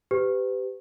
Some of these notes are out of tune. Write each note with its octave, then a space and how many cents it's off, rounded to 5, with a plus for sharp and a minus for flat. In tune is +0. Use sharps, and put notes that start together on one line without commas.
G4 +0 B4 +35